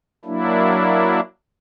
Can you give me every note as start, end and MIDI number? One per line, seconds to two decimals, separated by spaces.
0.25 1.20 54
0.25 1.20 58
0.25 1.20 62
0.25 1.20 64